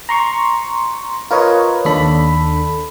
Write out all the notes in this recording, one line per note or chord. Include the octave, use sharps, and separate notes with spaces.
A#5 C6 C#6
F4 A#4 B4 C#5 D#5
D#2 D4 A4 B5